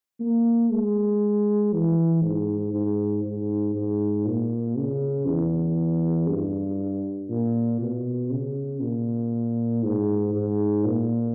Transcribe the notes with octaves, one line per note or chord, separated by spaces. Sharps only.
A#3
G#3
E3
G#2
G#2
G#2
G#2
A#2
C#3
E2
G2
A#2
B2
C#3
A#2
G#2
G#2
A#2